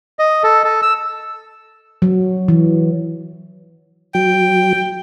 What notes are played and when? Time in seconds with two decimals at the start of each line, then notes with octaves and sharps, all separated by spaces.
0.19 D#5
0.43 A4
0.64 A4
0.82 E6
2.02 F#3
2.48 E3
4.15 F#3 G5